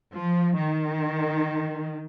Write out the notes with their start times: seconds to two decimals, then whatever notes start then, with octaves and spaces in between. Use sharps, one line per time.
0.14 F3
0.58 D#3